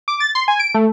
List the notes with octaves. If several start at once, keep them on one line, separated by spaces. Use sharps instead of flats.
D6
A6
C6
G#5
D7
A3